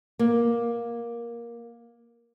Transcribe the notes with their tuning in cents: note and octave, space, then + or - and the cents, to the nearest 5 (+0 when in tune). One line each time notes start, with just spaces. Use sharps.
A#3 +10